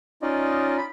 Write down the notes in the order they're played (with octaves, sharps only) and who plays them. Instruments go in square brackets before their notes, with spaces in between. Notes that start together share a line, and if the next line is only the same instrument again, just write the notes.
[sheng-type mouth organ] C#4 D#4 F4 D5 D#5
B5